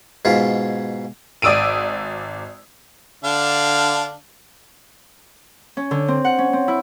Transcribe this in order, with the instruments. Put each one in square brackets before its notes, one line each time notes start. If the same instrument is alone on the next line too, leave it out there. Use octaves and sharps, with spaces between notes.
[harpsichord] G#2 B2 F4
[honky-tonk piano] G#1 D5 D#6 E6 D7 D#7
[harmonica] D3 D4 F5
[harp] C#4
D3
C4
F#5
C#4
C4
E4